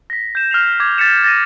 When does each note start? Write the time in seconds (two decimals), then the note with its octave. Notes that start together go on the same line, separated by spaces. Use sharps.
0.10 A#6 B6
0.35 G6 E7
0.51 F6 C7 F7
0.80 D6 G#6
0.98 G6 A6 B6 C#7 E7
1.24 A6 A#6 D#7